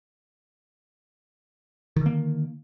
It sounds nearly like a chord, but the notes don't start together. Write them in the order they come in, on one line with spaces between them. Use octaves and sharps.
D#3 D3 A#3